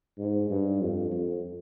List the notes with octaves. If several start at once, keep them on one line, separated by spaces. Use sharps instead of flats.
G#2
G2
F2
F2